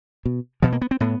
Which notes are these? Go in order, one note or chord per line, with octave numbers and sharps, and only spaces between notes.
B2
B2 F3
A#3
B3
C4
A2 B3